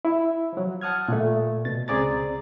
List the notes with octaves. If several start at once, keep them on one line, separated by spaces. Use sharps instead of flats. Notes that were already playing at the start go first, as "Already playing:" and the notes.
E4
F3 F#3
F#5 A5 D#6 F6 G#6
A#2 A3
B2 A6
C#2 C4 G#4 D5 A#5 A6